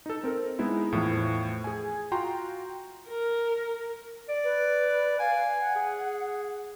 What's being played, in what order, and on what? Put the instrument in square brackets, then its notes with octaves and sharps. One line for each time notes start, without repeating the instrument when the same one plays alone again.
[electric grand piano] D#4 A4
C4 A#4
G#3 B3 D#4 E4
E2 A2 F3
G#4 G#5
F4 F#4 G5 A#5 C6
[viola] A#4
[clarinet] D5
[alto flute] B4
[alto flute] F5 [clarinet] G#5
[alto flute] F#5
[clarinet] G#4